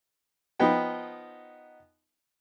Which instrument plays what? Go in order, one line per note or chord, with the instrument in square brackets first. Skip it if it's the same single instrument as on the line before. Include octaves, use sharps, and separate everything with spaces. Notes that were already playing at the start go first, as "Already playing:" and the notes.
[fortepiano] F3 B3 D#4 G5